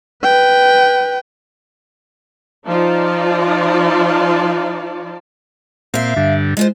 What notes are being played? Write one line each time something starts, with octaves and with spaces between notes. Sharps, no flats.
B4 G5
F3 D#4 F4 D5 A5
A#2 C4 E5 F5
G2 D3
G#3 F4 C5